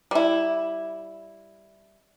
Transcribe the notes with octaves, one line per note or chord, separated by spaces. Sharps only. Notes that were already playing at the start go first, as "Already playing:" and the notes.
G3 E4